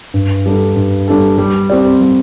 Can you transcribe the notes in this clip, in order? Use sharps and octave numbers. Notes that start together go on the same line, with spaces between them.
G2
G3 D4 A4
G2
G3 D4 A4
G3
C4 G4 D5
G3